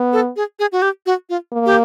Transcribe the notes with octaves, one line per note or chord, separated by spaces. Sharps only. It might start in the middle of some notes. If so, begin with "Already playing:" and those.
Already playing: B3
A4
G#4
G#4
F#4
G4
F#4
F4
A#3
G4